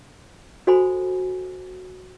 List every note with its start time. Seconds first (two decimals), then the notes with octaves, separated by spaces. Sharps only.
0.67 F#4 A4 C5 G#5 B5